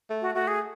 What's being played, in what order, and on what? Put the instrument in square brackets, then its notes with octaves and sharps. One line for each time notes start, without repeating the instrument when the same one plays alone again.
[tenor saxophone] A3
[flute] F#4
[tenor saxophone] A3 [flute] F#4
[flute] G#4